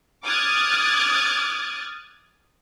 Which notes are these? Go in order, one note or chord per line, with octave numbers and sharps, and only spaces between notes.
D6 D#6 F6 F#6 G#6 A6